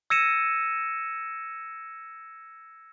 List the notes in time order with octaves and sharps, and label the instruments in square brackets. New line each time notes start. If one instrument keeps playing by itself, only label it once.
[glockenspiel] E6 G#6 A#6 C#7 D#7 E7